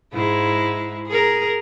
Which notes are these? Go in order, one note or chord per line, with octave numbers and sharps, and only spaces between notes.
G#2 G#3 E4
G#4 A#4